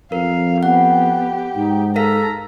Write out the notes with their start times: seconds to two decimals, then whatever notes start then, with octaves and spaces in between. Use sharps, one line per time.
0.12 F2 A#4 F5
0.63 B3 G4 F#5
1.56 G#2 D#4
1.96 A4 A#4 F5 A#5 B6